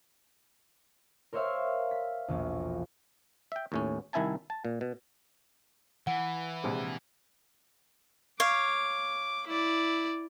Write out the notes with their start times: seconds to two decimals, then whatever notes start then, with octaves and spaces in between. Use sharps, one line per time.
1.33 A#4 C5 C#5 E5 F5
1.91 B6
2.28 E1 A#1
3.52 E5 G5
3.72 D#2 A2 C#4
4.13 C2 D#3 E4 E5 G#5 A5
4.50 A5
4.65 A#2
4.81 B2
6.07 E3 F#5
6.63 A#1 C3 G#3
8.40 C#5 F5 D6
9.47 E4 D5